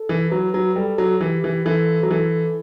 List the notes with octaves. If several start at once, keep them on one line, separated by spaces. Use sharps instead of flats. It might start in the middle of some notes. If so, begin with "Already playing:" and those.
Already playing: A4
E3
F#3 B4
F#3
G3 A4
F#3
E3 G4
E3
E3 A4
F#3
E3 A4